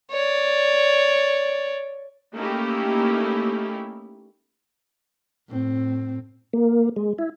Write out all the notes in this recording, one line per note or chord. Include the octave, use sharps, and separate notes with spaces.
C#5 D5
A3 A#3 C#4 D#4 E4 G4
A2 C4
A#3
G#3
E4